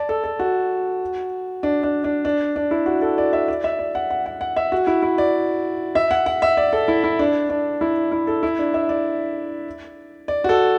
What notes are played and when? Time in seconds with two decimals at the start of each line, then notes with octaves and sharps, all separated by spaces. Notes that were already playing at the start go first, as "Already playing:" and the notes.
Already playing: D5 A5
0.09 A4
0.24 A4
0.39 F#4
1.63 D4
1.83 D4
2.04 D4
2.25 D4
2.56 D4
2.71 E4
2.86 F#4
3.02 A4
3.18 D5
3.33 E5
3.48 D5
3.64 E5
3.79 D5
3.95 F#5
4.10 F#5
4.26 F#5
4.41 F#5
4.56 E5
4.72 F#4
4.87 E4
5.03 E4
5.18 D5
5.95 E5
6.11 F#5
6.26 F#5
6.42 E5
6.57 D5
6.73 A4
6.88 E4
7.04 E4
7.19 D4
7.50 D4
7.81 E4
8.12 E4
8.27 A4
8.43 E4
8.59 D4
8.74 E5
8.89 D5
10.28 D5
10.44 F#4
10.49 A4